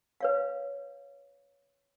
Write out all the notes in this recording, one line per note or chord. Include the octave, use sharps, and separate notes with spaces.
B4 C#5 F5